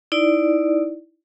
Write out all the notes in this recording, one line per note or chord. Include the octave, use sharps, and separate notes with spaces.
D#4 E4 D5